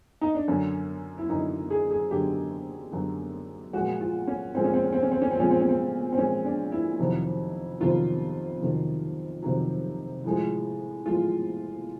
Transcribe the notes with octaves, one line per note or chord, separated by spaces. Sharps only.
D#4
D4
F#2 D3 F#3 C#4
E4
F#2 D3 F#3 D#4
G#4
G#4
F#2 D3 F#3 G4
F#2 D3 F#3
A#2 F3 G#3 F#4
F4
C#4
A#2 F3 G#3 C4
C#4
C4
C#4
C4
C#4
C4
C#4
C4
A#2 F3 G#3 C#4
C4
C#4
C4
C4
A#2 F3 G#3 C#4
D4
E4
F2 C3 D#3 F#3
F2 C3 D#3 F#3 F4
F2 C3 D#3 F#3
F2 C3 D#3 F#3
A2 F3 G#3
A2 F3 G#3 F4